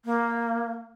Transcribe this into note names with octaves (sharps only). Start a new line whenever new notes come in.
A#3